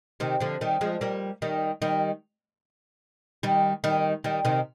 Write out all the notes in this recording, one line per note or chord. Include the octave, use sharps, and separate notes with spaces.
C3 D#3
D3 F3
D#3 G3
F3 G#3
G3 A#3
D#3 G3
D#3 G3
D#3 G3
D#3 G3
D#3 G3
C3 D#3